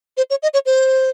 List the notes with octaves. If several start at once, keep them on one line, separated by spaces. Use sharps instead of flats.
C5
C#5
D#5
C#5
C5